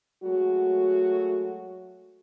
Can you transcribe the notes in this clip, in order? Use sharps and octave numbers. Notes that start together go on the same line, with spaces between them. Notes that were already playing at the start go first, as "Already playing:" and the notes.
F#3 G#3 A3 F#4